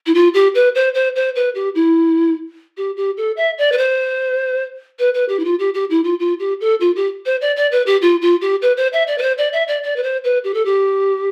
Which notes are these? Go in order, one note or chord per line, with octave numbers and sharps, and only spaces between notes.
E4
F4
G4
B4
C5
C5
C5
B4
G4
E4
G4
G4
A4
E5
D5
B4
C5
B4
B4
G4
E4
F4
G4
G4
E4
F4
F4
G4
A4
F4
G4
C5
D5
D5
B4
G4
F4
F4
G4
B4
C5
E5
D5
B4
C5
D5
E5
D5
D5
B4
C5
B4
G4
A4
G4